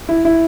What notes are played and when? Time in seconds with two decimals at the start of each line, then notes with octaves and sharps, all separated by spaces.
0.09 E4
0.25 E4